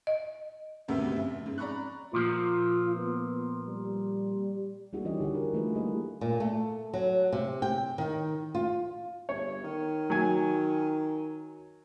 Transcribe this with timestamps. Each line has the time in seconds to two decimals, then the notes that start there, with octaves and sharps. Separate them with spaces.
0.07 D#5
0.88 G#1 D2 C3 B3 B4 E5
1.12 F1 E5
1.46 G#2
1.58 D5 A#5 B5 C#6 F#6
2.13 A#2 F3 F4
2.96 B3
3.67 G3
4.93 G3 A#3 D4 E4 F#4 G#4
5.05 E3 C#4 D#4 G4 D#5
5.20 D3 G#4 F#5
5.34 F#4 A#4
5.53 E3 A3 E4 F4 G#4 B4
5.75 G3 A#3 D#5
6.21 A#2
6.40 A3
6.94 F#3
7.33 C3
7.62 G5
7.98 D#3
8.55 F4
9.29 G1 C#5
9.64 D#3
10.10 F#3 G#5